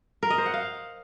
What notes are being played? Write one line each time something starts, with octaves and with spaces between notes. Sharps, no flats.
A#4
D#5
C5
F#5
F5